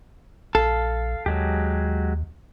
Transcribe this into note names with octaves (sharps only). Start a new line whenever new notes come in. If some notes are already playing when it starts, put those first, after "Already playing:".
A#1 A4 F5
D#2 F#3 G#3 G4